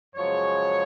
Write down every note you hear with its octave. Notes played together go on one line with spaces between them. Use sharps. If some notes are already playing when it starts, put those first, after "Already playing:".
F#2 C#3 F3 G#3 C#5